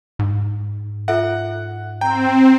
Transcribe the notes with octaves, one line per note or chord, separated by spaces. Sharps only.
G#2
F4 A4 E5 F#5
C4 G5 A#5